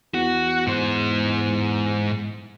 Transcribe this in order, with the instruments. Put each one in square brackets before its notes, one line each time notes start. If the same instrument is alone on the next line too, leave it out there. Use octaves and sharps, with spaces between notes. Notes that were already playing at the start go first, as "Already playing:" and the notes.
[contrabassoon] E2 [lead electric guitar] F#4
[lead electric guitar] G#2 C5